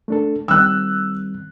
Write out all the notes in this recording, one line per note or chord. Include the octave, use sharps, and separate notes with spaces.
A3 D4 A4
D#3 G3 C4 E6 F#6